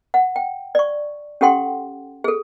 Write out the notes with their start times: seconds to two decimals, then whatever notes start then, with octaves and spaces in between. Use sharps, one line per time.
0.14 F#5
0.36 G5
0.75 D5 C#6
1.41 C#4 G4 A4 F#5 G5 C6
2.24 G#4 A4